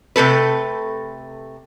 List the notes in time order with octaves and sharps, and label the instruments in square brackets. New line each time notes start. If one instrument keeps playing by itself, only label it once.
[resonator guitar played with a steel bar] C3 A3 A4 B4